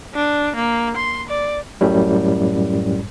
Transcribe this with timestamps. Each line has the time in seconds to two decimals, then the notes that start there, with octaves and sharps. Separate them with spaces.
0.14 D4
0.56 A#3
0.96 C6
1.29 D5
1.81 F#2 A2 G3